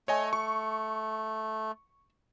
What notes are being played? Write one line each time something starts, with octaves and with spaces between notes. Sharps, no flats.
A3 C#5 D#5 G#5
C#6